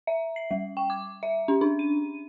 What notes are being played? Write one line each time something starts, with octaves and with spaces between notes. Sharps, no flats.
E5
C7
G3
G5
D6
E5
C#4
D4
D#7